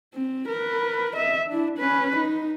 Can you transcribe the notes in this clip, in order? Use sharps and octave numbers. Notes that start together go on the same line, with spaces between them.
C4
A#4 B4
D#5 E5
D4 E4
C#4 B4
D#4